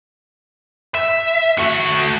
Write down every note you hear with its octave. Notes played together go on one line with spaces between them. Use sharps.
E5
A3 F#4